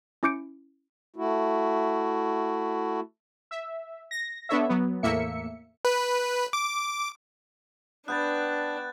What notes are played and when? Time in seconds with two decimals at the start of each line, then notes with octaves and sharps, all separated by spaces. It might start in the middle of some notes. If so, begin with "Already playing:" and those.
0.23 C#4 E4 D6 G6 C#7 D7
1.16 A3 E4 F#4
3.51 E5
4.11 A#6
4.49 B3 D4 A4 C#5 E5
4.69 F#3 B3
5.03 E2 A2 A#3 E5 C#7
5.85 B4
6.53 D6
8.08 B3 D4 G5 B5 F#6 G6 A6